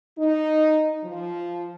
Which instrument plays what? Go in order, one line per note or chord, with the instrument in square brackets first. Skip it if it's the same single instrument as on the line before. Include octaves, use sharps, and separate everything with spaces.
[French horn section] D#4
F3